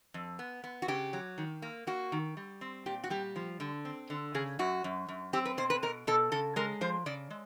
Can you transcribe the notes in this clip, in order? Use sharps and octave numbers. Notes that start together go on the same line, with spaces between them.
F2
B3
B3
F#4
C#3 G4
F#3
D#3
A#3
A#3 F#4
D#3
G3
C4
A#2 G4
F#4
G3 G4
F3
D3
C4
D3
C#3 G#4
F#2 F#4
F#2
F#2
C4 G4
B4
B2 C5
B4
B2 A#4
B2 A4
C#3 A4
G#3 A#4
F3 C5
C#3 D5
G#3